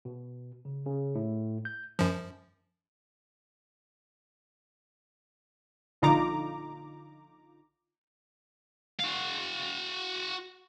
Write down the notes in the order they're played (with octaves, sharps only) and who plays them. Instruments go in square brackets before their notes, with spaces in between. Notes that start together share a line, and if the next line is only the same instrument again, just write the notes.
[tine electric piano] B2
C#3
C#3
A2
G6
[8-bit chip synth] F#2 F3
[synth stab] A#1 D3 D#4 F4 A#5 D6
[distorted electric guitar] F#4 F5